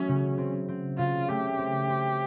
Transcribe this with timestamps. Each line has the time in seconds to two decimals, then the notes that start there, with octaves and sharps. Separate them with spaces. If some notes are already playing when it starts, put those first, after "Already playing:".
Already playing: F#3 A3 C#4
0.08 C#3
0.38 C4
0.68 C4
0.98 C#3 F4
1.28 A3 G4
1.58 C4
1.90 C4